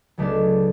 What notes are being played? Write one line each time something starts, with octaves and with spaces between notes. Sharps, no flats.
C#2 B2 F#3 A3 D4